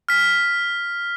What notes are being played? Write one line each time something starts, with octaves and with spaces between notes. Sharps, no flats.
F6 B6